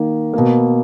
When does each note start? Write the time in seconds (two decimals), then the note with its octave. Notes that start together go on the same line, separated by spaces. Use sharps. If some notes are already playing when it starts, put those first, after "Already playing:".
Already playing: D#3 A#3
0.34 B2 A#3